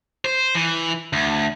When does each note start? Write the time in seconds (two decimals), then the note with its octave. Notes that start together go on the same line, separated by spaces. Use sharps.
0.25 C5
0.55 E3
1.13 D2